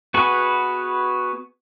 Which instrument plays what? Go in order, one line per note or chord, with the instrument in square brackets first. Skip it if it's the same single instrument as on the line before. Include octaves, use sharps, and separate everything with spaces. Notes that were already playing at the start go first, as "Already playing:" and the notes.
[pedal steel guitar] B3 F#4 G#4 B4